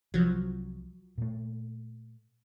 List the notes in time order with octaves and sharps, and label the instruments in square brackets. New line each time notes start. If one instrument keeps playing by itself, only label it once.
[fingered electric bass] C2 [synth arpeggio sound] F3 F#3
[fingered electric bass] A#2 A3